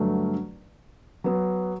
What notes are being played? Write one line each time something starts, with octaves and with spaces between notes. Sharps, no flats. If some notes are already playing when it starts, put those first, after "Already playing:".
Already playing: G2 D3 F#3 A3
F#3 B3